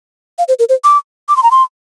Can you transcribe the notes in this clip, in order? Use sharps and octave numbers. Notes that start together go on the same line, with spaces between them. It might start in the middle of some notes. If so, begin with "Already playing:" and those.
F5
C5
A#4
C5
D6
D6
C6
A#5
C6